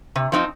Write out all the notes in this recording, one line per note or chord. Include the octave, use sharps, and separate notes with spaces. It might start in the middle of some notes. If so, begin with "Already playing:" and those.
C3
F3 C4 D#4